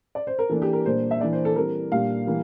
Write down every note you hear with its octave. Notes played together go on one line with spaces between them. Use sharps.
D5
C5
A#4
E3 A#3 D4 A4
G4
A#4
A#2 G3 A#3 D4 C5
E5
E3 A#3 D4 D5
C5
A4
E3 G3 C4 A#4
A#2 G3 A#3 D4 F5
E3 G3 A#3